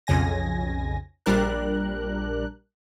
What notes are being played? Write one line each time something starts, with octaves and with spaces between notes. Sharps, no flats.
B1 F2 C#3 G#5 A#6
A#1 G3 D4 A#4 F#6